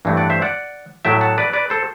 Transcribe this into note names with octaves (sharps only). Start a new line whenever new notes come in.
G2 E3 A3 C4
D5 F#5
C5 E5
D5 F#5
A2 F#3 A3 E5 G5
F#5 A5
B4 D5
B4 D5
A4 C5